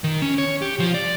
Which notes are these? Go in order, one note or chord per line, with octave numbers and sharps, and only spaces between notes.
D#3
C#4
C#5
G4
F3
D5